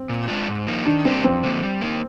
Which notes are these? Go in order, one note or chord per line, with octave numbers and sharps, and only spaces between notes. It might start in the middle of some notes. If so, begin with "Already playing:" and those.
Already playing: C4
A#2
G#3 D4 F4
G#2
F3 A#3 D#4
D#3 D4
G3 A#3 C4 D4 G4
F2 C4
D3 F3 A#3
G3
A#3 D#4